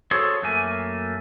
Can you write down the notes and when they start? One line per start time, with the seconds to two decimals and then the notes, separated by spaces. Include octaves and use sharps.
0.11 F#4 G#4 A4 C5 C#5
0.42 F#2 A3 A#3 G#5